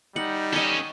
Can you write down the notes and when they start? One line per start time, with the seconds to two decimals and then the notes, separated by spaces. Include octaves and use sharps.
0.16 G3 D#4 F#5
0.53 C#4 A4 C#5 D#5